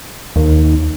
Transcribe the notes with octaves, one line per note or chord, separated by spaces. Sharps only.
D#2